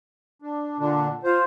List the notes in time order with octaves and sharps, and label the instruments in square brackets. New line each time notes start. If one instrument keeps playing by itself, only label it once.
[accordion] D4
A#2 D3 D4
[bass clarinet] F4 [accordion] C5